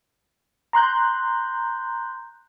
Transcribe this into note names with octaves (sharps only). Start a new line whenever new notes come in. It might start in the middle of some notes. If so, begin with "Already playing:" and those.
A#5 C6 F#6 G6